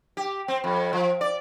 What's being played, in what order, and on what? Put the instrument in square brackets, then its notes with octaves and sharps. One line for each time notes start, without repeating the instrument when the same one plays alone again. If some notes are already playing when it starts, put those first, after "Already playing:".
[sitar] G4
C4
F2
F3
D5